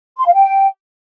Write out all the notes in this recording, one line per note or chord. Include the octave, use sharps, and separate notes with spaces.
C6
F5
G5